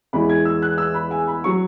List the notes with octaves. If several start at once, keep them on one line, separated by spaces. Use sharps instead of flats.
E2 E3 G#3 B5
G#6
E6
F#6
E6
B5
G#5
B5
F#3 C#6